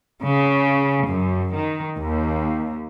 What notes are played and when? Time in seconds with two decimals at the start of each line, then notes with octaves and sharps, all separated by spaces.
0.22 C#3
1.08 F#2
1.55 D#3
1.99 D#2